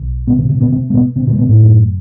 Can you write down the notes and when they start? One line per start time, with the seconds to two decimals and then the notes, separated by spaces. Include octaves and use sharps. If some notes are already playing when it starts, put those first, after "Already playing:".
Already playing: B1
0.27 B2 B3
0.39 C3 C4
0.49 C3 C4
0.61 B2 B3
0.72 C3 C4
0.90 A3
0.94 B2 B3
1.16 C3 C4
1.27 B2 B3
1.33 A3
1.38 B2 B3
1.49 A2 A3
1.60 F#1 F#2